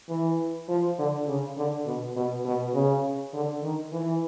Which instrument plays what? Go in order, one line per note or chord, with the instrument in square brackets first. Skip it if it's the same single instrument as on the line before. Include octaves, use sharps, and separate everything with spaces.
[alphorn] E3
F3
D3
C#3
D3
B2
B2
B2
C#3
D3
D#3
E3